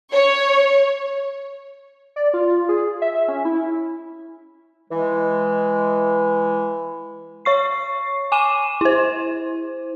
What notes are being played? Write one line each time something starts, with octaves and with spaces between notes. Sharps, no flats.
C#5
D5
F4
G#4
E5
C#4
E4
E3 G#3
C#5 C#6 C7
G#5 D6 D#7 E7
E4 C5